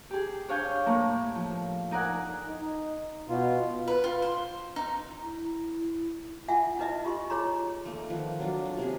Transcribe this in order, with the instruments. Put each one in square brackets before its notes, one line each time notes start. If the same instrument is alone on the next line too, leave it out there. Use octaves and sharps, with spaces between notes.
[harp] G4 G#4
D4 C#5 F5 G#5 G6
A2 A3 A#3
F3
D#4 A#4 D5 F#5 G#5
[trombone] D#4
[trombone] B2 [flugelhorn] F4
[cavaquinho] B4
F4
C5
D#4
[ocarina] E4
[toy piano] F4 E5 F#5 G#5
D#4 E4 B4 D#5 E5
F4 G4 C6
D#4 G#4 C#5 A#5 C6
[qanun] A3 A#3 D#4
D#3 F3 B4 F#5
F#3 D4 F4
D4
C3 A#3 G#4